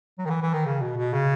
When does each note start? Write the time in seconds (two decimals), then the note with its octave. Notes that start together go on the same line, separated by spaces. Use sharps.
0.19 F#3
0.25 D#3
0.30 E3
0.42 E3
0.54 D#3
0.66 C#3
0.81 B2
0.97 B2
1.13 C#3